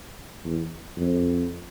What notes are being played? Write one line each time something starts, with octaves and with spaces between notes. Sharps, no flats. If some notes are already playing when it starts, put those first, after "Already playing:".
E2
F2